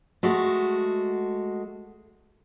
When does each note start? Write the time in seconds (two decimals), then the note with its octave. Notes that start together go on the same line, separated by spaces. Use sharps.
0.23 G#3 A3 F#4